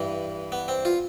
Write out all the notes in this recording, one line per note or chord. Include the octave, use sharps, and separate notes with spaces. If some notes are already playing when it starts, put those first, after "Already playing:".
Already playing: G2 E3
B3
C4
F4